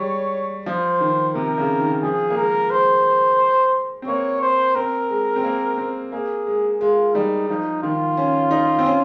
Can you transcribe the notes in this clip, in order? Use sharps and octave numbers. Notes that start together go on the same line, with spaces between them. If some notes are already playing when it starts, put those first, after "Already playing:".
Already playing: G3 G#3 C#5
F3 C5
D#3
C3 A#4
C#3
D#3
F3 G#4
A#3
G#3 A#4
C5
C4
A#3 C#5
C5
C4 A#4
G#3
C4
A#3
C4
A#3 G#4
G#3
G#3 F4
G3 D#4
F3 D#4
D#3 F4
C#4
D#4
C4
C#4